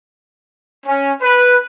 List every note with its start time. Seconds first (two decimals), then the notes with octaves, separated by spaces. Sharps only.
0.86 C#4
1.21 B4